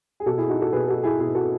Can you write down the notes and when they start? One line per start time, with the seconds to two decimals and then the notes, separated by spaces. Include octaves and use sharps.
0.20 G#4
0.26 B2 F#4 A4
0.38 E4 G#4
0.49 D#4 F#4
0.61 F#4 A4
0.72 B2 G#4 B4
0.88 F#4 A4
1.03 E4 G#4
1.19 B2 E4 G#4
1.35 F#4 A4